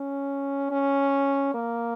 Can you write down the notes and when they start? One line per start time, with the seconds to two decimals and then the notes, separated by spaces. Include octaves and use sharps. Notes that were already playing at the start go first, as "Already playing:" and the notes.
Already playing: C#4
0.71 C#4
1.54 A#3